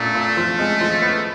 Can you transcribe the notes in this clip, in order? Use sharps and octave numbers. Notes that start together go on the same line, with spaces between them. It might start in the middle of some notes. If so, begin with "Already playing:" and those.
Already playing: A#2 A3 D4
A#2
F3
G#3
F3
B3